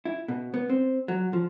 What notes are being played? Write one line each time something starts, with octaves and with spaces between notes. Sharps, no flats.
E4
B2
B3
C4
F#3
F3